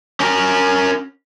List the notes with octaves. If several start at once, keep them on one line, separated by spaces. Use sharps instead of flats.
C#4 A#4